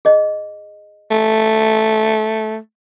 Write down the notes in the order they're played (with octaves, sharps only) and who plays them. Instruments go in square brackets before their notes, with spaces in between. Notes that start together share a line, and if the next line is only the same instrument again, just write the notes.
[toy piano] G#4 D#5
[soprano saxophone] A3